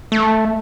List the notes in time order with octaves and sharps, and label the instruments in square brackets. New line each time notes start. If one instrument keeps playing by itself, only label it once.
[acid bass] A3